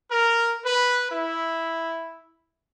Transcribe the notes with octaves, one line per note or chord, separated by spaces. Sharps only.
A#4
B4
E4